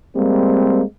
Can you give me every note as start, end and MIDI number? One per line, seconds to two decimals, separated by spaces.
0.16 0.82 55
0.16 0.82 56
0.16 0.82 58
0.16 0.82 60